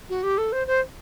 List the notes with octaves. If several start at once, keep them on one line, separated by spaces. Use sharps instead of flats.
F#4
G4
A4
C5
C5